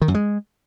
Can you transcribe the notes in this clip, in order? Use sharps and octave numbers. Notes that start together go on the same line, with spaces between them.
D#3
F#2
G#3